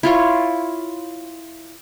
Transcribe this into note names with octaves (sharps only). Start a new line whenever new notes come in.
E4 F4 C#5